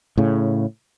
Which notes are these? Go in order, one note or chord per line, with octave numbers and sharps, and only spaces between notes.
A2 C#3